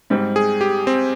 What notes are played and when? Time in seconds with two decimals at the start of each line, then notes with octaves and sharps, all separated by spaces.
0.10 G#2 G3 C4
0.36 G#4
0.61 G4
0.87 C4